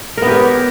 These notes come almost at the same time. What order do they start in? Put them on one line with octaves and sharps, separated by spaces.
A#4 B3 G4 C#5